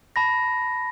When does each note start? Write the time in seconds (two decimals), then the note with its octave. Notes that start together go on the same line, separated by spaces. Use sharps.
0.16 A5 B5 A#6